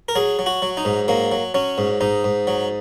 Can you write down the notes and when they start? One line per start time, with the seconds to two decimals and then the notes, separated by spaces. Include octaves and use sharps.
0.09 A#4
0.16 F#3 G#4
0.39 F#3
0.46 F#4
0.62 F#3
0.77 D#4
0.85 G#2
1.08 F#3 A#3
1.32 F#3
1.54 F#3 C#4
1.78 G#2
2.01 G#2 D#4
2.24 G#2
2.47 F#3